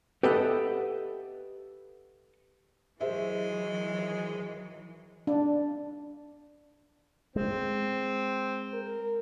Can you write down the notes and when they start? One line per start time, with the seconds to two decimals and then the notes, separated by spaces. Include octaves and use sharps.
0.23 G4 A4 B4 D#5 E5 F#5
3.01 D#3 E3 F#3 G#3 G#4 C5 E5
5.27 D4
7.36 G#3 C4
8.73 A#4